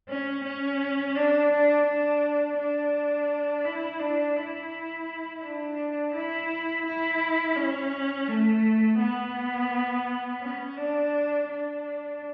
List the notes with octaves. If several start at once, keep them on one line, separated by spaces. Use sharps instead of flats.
C#4
C#4
D4
D4
D4
D4
E4
D4
E4
D4
E4
E4
C#4
A3
B3
C#4
D4
D4